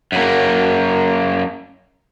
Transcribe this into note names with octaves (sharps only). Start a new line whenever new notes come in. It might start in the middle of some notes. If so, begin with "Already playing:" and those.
F#2 A#3